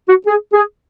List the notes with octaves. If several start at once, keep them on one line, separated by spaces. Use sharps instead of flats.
F#4
G#4
G#4